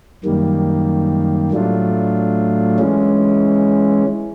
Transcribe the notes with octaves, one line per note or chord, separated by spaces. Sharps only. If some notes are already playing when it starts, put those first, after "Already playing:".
F#2 D#3 G3 A#3
A2 F#3 A3 D4 F4
E3 G#3 C#4